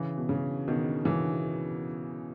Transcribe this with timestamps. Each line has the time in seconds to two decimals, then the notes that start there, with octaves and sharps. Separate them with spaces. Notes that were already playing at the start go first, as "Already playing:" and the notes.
Already playing: C#3 E3
0.18 B2
0.29 C#3
0.68 B2 D#3
1.05 C#3 E3